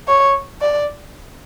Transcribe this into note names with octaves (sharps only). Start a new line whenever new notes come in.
C#5
D5